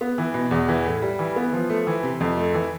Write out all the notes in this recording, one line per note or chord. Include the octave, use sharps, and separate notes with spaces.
B3
E3
B2
E2
E3
A2
G3
E3
B3
F3
A3
E3
C3
F2
A3
E3